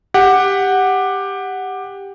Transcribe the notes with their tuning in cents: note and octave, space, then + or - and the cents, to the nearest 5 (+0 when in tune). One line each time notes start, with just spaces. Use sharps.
G4 +10 F#5 +0